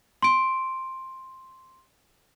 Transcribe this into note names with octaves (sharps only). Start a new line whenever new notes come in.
C6 D7